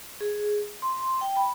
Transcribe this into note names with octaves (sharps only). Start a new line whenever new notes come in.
G#4
C6
G5
B5